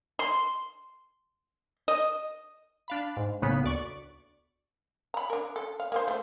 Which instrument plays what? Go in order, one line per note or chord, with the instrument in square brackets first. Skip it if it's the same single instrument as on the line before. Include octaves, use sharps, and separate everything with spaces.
[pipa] C6
D#5
[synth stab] D4 F5 B5
G#2
B1 A2 C#3 A#3 B3 B6
D2 D5 C#6 D6
[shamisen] A#5 B5
D4 A#4
A4
F5
A#3 D#4 C5
A3 C5